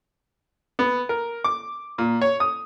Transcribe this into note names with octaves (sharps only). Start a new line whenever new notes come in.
B3
A#4
D6
A#2
C#5
D#6